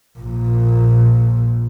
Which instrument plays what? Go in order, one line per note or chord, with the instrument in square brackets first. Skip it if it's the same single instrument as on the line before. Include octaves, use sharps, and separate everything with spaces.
[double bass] A#1 A#2